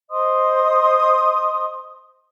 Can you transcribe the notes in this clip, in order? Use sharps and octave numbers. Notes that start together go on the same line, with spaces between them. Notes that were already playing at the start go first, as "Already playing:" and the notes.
C5 D#5 C6 D#6